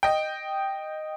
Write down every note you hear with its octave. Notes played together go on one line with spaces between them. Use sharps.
D#5 G5